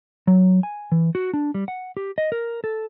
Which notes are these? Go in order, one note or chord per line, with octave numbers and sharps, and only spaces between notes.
F#3
G#5
E3
F#4
D4
G3
F#5
G4
D#5
A#4
A4